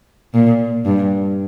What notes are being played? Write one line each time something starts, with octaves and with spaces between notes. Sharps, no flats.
A#2
G2